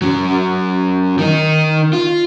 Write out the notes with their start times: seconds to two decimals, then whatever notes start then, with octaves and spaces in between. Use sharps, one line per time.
0.02 F#2 F#3
1.18 D#3 D#4
1.93 F4